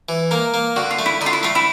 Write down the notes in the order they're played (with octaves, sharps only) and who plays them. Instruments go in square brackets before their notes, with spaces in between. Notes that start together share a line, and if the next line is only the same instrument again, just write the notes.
[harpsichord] E3
[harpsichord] A#3 [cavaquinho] A#4
[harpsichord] A#3
[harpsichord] D3 [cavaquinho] F#4
[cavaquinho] F4
[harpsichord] A3
[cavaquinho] E4
[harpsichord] D3 [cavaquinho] D#4
[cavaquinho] F4
E4
[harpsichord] A3 [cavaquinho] F4
[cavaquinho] E4